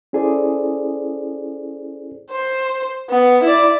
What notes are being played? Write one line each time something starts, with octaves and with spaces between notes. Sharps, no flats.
C#4 E4 G#4 A4 C5 D5
C5
B3
E4 D5